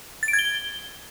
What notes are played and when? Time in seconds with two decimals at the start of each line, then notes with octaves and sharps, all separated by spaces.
0.23 A6
0.28 D7
0.33 G#6
0.39 G7